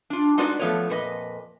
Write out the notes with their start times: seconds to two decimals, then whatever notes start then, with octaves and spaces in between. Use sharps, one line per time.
0.10 D4 F4
0.38 G#3 D#4 F4 F#4 B4 D5
0.59 F3 A3 B3 B4 C#5
0.89 F2 A#2 B4 D#5